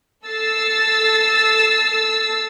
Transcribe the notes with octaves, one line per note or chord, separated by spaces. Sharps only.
A4 E6 A6 C7